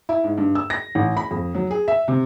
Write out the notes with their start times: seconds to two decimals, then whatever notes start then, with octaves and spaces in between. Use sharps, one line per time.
0.09 E4
0.24 G#2
0.38 G2
0.55 E6
0.70 A#6
0.95 A1
1.17 B5
1.31 F2
1.55 F#3
1.71 G#4
1.88 E5
2.08 C3